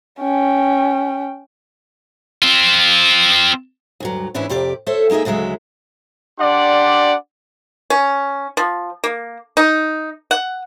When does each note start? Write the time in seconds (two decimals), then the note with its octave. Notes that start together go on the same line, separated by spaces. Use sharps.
0.20 C#4 G5
2.42 C4 F4
4.00 D2 G2 F#3
4.34 G#2 E3 C#4 D4 E4
4.49 F2 C3 G4 D5
4.86 A4 C5 C#5 E5
5.10 G#3 A#3 D#4 G#4 E5
5.25 D2 C#3 F#3 G#3 E5
6.39 D4 G4 D5 F#5 C6
7.90 C#4
8.57 F3
9.04 A#3
9.57 D#4
10.31 F#5